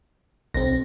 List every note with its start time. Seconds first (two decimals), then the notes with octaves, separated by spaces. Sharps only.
0.54 B1 C4 A#6